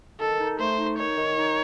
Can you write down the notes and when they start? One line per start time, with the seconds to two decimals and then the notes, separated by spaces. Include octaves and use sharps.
0.20 D#3 A4
0.40 D#4
0.59 A3 C5
0.79 D#4
0.98 D#3 C#5
1.17 D#3
1.37 D#4